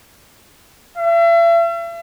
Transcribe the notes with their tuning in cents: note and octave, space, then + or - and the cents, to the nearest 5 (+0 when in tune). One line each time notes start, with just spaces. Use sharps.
E5 +40